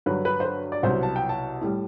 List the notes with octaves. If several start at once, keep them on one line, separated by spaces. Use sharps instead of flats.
G2 D3 F#3 B4
B4
C5
B4
D5
C2 B2 F#3 C5
A5
G5
A5
A2 G3